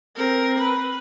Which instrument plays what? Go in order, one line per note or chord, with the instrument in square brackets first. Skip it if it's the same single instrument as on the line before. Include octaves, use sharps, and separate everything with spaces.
[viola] C4 A#4
B4